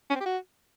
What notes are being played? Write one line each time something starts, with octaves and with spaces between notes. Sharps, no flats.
C#4
C4
G4
F#4